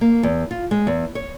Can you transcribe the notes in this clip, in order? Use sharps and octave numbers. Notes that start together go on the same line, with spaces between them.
A#3
E2
F4
G#3
E2
C#5